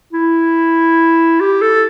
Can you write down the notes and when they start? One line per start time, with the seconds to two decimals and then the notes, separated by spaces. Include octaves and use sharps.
0.13 E4
1.41 G4
1.62 A4